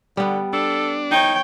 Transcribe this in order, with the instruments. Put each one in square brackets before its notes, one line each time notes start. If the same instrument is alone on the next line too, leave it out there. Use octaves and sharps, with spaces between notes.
[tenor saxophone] D3 [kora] G3 B3
[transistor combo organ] D4 [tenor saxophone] A4
[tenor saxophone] D#4 [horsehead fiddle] C#5 G5